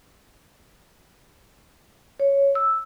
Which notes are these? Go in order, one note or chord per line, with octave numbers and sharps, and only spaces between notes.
C#5
E6